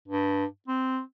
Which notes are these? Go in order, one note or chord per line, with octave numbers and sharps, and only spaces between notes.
G2
C4